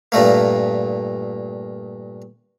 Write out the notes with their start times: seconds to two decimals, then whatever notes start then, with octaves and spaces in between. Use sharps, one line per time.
0.12 G2 A#2 A3 A#3